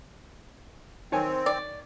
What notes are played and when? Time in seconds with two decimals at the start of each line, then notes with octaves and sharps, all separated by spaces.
1.12 D#3 C4 C#5 G#5
1.46 D5